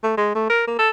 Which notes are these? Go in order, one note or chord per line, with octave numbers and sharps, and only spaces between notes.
A3
G#3
A3
A#4
A#3
A4